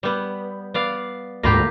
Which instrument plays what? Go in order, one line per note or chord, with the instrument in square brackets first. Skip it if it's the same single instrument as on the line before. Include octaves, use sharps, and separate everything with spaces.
[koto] G3 B3
B3 D5 F5
[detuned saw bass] D2 [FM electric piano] G#2 B5 A#6 [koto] A#3 F4 G4